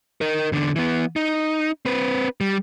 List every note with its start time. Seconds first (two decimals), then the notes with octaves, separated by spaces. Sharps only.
0.21 A#4 D#5
0.52 E2 D3
0.76 E3 B3
1.16 D#4
1.85 C4 B4
2.41 G3